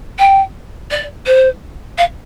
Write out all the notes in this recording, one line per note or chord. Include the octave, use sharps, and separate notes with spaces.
G5
D5
C5
F5